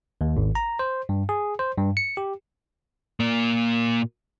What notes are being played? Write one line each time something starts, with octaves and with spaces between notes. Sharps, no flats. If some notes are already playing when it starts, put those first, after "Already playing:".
D#2
G#1
A#5
C5
G2
G#4
C5
G2
C#7
G4
A#2 A#3